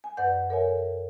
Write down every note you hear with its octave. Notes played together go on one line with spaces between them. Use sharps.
G#5
F#2 B4 D5 F#5 G6
A4 A#4 C#5 E5 G#5